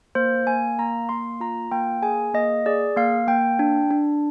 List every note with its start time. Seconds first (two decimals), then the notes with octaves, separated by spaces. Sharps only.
0.15 A#3 C5
0.47 A#3 G#5
0.79 A#3 A#5
1.09 A#3 C6
1.40 F4 A#5
1.72 A#3 G5
2.02 G#4 G#5
2.34 A#3 D#5
2.66 G#4 D5
2.96 A#3 F5
3.27 A#3 G5
3.59 D4
3.91 D4